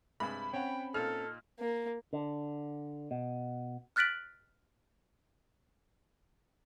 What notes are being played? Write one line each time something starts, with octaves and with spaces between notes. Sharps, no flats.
G2 C3 G#3 B5
C4 C#4 C#5 F#5 G5
A#2 D#4 A4 F6
A#3
D3
B2
F6 F#6 A6 B6 D7 F#7